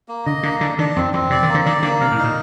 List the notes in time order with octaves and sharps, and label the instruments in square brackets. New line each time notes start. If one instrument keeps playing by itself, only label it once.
[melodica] A#3
[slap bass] D3 [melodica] D#5
[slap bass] D3 [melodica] A#3
[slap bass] D3 [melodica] D4
[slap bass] D#3 [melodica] D4
[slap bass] F2 [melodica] C4
[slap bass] F2 [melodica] C4
[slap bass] C3 [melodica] D5
[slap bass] D#3
[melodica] A#3
[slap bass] D3
[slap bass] D#3 [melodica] D5
[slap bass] D3 [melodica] A#3
[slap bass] C3 [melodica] F5
[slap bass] A2
[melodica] D#4
[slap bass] A#2